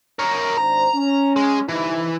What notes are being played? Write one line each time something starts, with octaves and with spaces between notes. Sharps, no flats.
A#4 C#5
G#1 D4 C5 A#5
C#4
G#3
G1 C3 E3 D#4